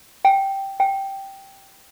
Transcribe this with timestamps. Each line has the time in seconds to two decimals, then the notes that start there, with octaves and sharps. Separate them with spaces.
0.25 G5
0.80 G5